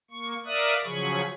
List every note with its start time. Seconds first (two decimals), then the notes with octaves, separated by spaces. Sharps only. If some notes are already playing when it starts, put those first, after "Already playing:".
0.11 A#3 C#6
0.46 A#4 D5 E5 F5 D#6 F#6
0.84 C#3 F3 F#3 G#4 B5 C#6